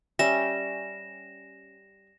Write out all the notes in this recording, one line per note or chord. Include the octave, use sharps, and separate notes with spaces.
G3 C#4 E5 A#6 E7